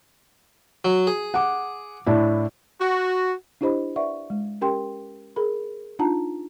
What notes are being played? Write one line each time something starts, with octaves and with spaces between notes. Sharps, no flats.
F#3
G#4
F#5 D6
A2 D4 E4
F#4
D4 E4 G4 C5 D#5 B5
B4 D5 E5 F#5 C#6
G#3
C#4 G4 A#4 G5 C6
G#4 A#4 B5
D4 D#4 F4 F#5 A5 A#5